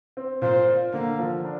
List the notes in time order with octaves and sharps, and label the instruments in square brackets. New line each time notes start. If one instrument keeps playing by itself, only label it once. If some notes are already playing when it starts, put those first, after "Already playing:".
[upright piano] C4
[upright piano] A#2 [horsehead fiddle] C5
[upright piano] F4
[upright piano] D3 [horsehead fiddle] A#3
[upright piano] F3
D4